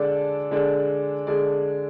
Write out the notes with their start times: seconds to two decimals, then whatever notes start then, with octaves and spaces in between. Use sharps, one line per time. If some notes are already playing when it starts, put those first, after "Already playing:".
Already playing: D3 G#3 D4 A4 D5
0.51 D3 G#3 D4 A4 D5
1.27 D3 G#3 D4 A4 D5